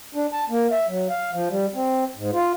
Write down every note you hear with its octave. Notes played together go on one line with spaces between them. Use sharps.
D4
A5
A#3
E5
F#3
F5
F3
G3
C4
G#2
F4